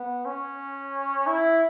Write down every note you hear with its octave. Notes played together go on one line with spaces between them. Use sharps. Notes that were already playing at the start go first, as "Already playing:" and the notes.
Already playing: B3
C#4
E4